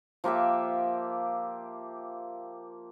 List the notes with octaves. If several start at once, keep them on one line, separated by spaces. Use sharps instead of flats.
F3 A#3 G4 E5